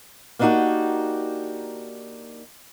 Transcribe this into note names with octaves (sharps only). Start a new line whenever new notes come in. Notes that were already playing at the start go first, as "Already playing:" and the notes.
A#3 B3 D4 D#4 F#4 G4